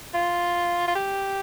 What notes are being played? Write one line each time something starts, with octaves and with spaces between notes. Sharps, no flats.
F4
F4
G4